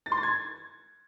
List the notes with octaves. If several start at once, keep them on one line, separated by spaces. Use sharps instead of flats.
A6
C6
A6
G#6